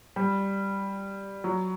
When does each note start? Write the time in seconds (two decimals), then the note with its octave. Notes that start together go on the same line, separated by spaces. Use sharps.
0.16 G3
1.44 F#3